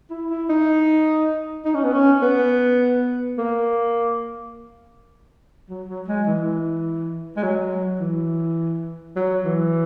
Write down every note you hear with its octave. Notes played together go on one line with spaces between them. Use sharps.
E4
E4
D#4
D#4
C#4
B3
C#4
B3
A#3
F#3
F#3
G#3
E3
G#3
F#3
E3
F#3
E3